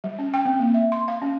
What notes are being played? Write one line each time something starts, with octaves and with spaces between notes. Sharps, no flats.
G3
C#4
G5
C4
A#3
E5
C6
F5
C#4